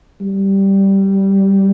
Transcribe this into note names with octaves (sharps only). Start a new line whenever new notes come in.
G3